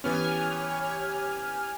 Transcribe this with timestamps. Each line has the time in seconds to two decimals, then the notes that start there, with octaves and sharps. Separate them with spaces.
0.04 E3 B3 C#4 G4 C#5 G#5 F6